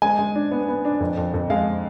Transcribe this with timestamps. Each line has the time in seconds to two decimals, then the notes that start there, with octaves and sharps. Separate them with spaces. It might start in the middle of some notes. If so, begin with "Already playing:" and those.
0.02 G#3 G#5
0.19 G#3
0.35 D4
0.51 B3
0.69 B3
0.85 D4
1.00 F2
1.17 F2
1.34 F2
1.50 G#3 F5